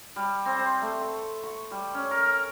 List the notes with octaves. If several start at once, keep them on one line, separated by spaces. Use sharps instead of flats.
G3
C4
C5
A3
C#6
C#6
G3
C#4
A#4